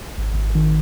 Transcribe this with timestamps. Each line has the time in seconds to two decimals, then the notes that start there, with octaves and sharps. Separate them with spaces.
0.18 G#1
0.36 G#1
0.55 D#3